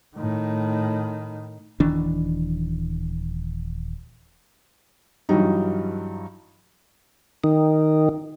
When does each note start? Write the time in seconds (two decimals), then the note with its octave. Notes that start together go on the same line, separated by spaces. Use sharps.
0.17 A2 D#3
1.80 D#1 D#3 E3 D4
5.29 G2 E3 F#3 G3 D#4
7.44 D#3